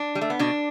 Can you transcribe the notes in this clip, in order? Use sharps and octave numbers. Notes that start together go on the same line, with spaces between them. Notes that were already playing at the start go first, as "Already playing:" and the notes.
Already playing: D4
G3
A3
B3
B2 D4